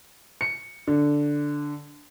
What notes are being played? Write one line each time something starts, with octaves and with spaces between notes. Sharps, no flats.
C#7
D3